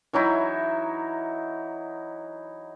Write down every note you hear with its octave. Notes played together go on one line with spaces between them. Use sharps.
E3 F#3 D#4 E4